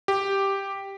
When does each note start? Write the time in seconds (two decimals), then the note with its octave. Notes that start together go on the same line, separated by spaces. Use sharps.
0.08 G4